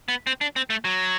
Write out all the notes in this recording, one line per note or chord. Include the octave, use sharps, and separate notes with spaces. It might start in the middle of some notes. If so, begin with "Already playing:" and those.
B3
C4
D4
C4
A3
F#3